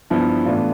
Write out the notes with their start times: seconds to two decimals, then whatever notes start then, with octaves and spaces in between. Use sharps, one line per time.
0.10 G2 F3 B3 E4
0.45 A2 E3 B3 D4 F4